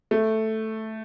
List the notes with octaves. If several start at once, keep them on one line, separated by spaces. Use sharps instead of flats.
A3